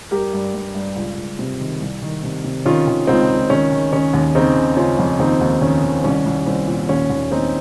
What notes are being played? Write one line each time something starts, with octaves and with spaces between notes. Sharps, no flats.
G2 G4 A#4
G2
G2
G2
C#2
C#2
C3
D#3
C2
D#3
C3
C3
D#3 C#4 F4
D#3
C#2 C4 D#4
C#2
D#3 C#4
D#3
D#3 C#4
D#2
C#3 C4 D#4
C#3
C#3 C#4 F4
F2
D#2 C4 D#4
D#2
D#3 C#4
D#3
C2 C#4
C2
C2 C4
A#2
D#2 C#4
D#2
D#2 C4 D#4